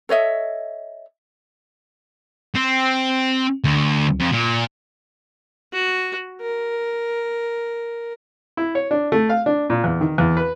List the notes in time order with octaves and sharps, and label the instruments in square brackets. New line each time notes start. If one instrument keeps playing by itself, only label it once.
[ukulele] A4 C#5 D#5 E5
[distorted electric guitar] C4
D2
F2
A#2
[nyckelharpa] F#4
A#4
[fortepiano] E4
C#5
D4
A3
F5
D4
A#2
E2
D#3
E2
B4